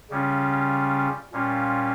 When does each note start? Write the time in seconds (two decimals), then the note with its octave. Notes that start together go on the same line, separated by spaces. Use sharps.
0.11 C#3 G3 C#4 F4
1.33 A#2 G3 C#4 F4